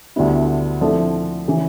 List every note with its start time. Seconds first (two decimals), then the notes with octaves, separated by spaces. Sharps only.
0.16 D2 D3 G3 B3 E4
0.81 D3 F3 A3 C4 E4
1.48 C#3 E3